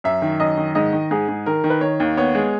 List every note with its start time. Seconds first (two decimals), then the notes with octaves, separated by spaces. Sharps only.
0.04 F#2 E5
0.22 D#3
0.40 F#2 D#5
0.57 D#3
0.75 G#2 D#5
0.93 D#3
1.11 G#2 G#4
1.28 G#2
1.46 D#3 A#4
1.64 D#3
1.70 B4
1.81 D#3 C#5
2.00 D#2
2.17 B3 C#5
2.35 G#3